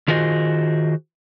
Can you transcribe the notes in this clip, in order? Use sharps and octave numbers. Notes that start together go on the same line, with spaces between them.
D#3 F4 F#4 G#4 C5 D#5